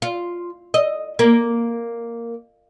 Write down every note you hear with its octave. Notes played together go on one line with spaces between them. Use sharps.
F4
D#5
A#3